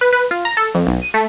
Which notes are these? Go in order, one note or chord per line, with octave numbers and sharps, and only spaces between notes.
B4
B4
F4
A#5
A4
F2
B1
D#7
A3